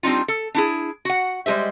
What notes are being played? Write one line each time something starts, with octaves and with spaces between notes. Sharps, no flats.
G3 C4 D4 D#4 F4
A4
D4 E4 G#4
F#4 F#5
G3 G#3 G#4 C5 E5